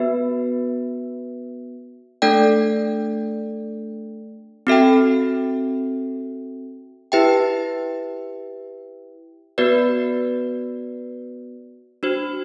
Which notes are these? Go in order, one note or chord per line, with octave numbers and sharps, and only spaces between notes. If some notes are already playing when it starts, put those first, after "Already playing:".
Already playing: B3 F#4 B4 E5
A3 D4 A4 D5 G5
C4 F#4 A4 E5 G5
E4 G4 B4 E5 G5
B3 F#4 B4 D5
D4 F#4 C5